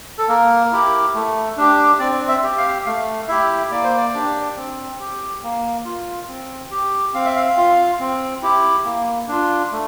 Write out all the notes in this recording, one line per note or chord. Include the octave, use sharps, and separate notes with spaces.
A4
A#3 A#4
E4 G4
A3
D4 G4
C4 D5
E5
G4
F5
A3 F5
E4 G4 E5
A#3 D5
C5
D5
D4 G4
C4
G4
A#3
F4
C4
G4
C4 F5
E5
F5
F4
C4
E4 G4
A#3
D4 F4
A3